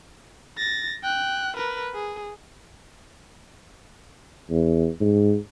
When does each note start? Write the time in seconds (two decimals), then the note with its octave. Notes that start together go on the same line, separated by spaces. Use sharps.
0.58 A6 A#6
1.03 G5 F#6
1.57 A#4 B4
1.94 G#4
4.50 E2
5.00 G#2